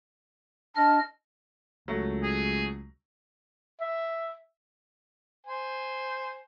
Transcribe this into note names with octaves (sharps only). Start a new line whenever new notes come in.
D4 D#5 A5 F6
C#2 F#3 A3
G#4
E5
C5 G#5